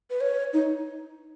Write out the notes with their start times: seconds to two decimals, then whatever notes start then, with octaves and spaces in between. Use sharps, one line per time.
0.10 B4
0.21 C#5
0.53 D#4